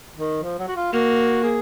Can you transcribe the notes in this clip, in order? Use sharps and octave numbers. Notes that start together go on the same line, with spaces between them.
D#3
F3
F#3
F#4
F4
A#3 F#4
G#4